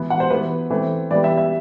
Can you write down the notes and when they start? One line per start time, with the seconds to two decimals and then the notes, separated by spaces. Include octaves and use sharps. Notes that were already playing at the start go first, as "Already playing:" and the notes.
Already playing: E3 B3
0.10 F#5
0.20 C5
0.30 E3 B3 B4
0.70 E3 A3 C4
1.11 E3 G3 B3 D5
1.24 E5
1.38 E5